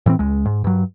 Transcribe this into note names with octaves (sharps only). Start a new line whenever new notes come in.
A2 E3 F3 C4
C#2 G#3
G#2
G2 F#3